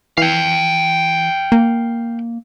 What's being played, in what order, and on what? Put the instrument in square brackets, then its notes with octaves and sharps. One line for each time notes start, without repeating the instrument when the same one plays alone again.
[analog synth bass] E3 [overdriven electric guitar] F5 G5
[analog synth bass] A#3